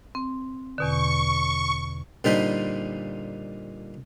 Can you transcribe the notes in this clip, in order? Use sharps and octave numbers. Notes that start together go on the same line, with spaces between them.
C4
E2 B2 D3 C#6
A#2 D3 G3 D#4 C5 B5